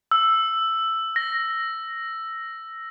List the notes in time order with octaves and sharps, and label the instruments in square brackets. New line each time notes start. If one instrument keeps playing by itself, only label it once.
[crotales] E6
A#6